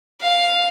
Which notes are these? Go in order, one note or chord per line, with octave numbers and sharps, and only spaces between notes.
F5